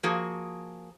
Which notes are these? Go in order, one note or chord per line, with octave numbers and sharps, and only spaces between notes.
F3 A#3 F#4 G#4